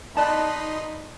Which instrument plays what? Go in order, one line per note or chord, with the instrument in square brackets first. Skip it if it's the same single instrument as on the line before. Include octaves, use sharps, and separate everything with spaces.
[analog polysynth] D#4 D#5 C6 [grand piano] D5 F#6 [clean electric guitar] A5 [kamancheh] B5